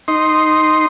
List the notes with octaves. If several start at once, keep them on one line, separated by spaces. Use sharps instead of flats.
D#4 C6